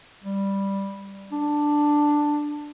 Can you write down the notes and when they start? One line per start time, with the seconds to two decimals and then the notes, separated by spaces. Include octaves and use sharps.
0.24 G3
1.32 D4